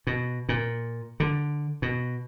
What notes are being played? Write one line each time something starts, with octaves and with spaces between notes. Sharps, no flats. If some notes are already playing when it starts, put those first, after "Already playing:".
B2
A#2
D3
B2